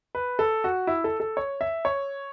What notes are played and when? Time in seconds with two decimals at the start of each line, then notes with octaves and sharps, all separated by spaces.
0.15 B4
0.39 A4
0.64 F#4
0.87 E4
1.04 A4
1.20 A4
1.37 C#5
1.61 E5
1.85 C#5